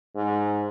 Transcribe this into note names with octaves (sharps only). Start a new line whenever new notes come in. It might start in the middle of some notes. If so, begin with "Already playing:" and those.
G#2